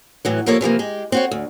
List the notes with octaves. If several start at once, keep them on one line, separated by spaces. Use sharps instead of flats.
A2 E3 F#3
C3 F3 A#3 A4 C#5
C3 E3 F3 A#3
G#3 G4
C4 F#4 C#5
D2